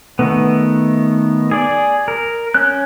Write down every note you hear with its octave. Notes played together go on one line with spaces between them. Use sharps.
D#3 A3 B3
G#4 D5
A#4
C#4 F#6